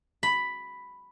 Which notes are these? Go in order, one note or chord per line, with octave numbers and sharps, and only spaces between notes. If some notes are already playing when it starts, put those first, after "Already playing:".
B5